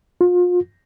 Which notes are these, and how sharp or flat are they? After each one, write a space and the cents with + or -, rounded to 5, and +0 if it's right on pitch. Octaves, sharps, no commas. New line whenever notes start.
F4 +35